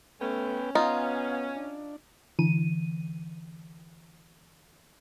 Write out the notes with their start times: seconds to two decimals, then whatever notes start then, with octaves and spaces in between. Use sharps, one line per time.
0.21 A3 B3 C#4 B4 G5
0.75 B3 D#4 F4 F5 G#5
1.56 D4
2.39 D3 E3 D#7